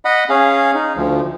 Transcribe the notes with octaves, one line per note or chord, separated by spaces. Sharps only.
D#5 F#5 B5
C#4 G#4 F5
D#4
D2 F3